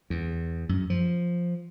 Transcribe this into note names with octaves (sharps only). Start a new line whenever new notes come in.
E2
F#2
F3